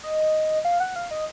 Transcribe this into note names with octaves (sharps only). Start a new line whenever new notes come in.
D#5
F5
F#5
F5
D#5